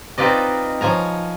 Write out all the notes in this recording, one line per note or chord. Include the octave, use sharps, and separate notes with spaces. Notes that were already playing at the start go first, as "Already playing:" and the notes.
C4 D#4 F4 B4 D5 D#5
F3 C#5 G#5 A#5